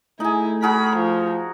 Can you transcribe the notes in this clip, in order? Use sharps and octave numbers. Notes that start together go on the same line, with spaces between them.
A3 D#4 E4 G#4
F#4 G#4 A#4 B5
F3